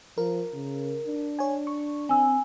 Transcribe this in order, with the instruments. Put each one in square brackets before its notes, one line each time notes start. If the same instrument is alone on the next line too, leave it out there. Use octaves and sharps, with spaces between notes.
[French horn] F3 [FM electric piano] A#4
[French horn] C#3
D4
[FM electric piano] C#5 G#5
C#6
[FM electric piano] C4 [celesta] G#5 E6